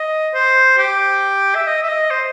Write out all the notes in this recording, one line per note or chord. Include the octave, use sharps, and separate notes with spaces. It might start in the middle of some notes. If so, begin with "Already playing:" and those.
Already playing: D#5
C5
G4
E5
D#5
E5
D#5
C5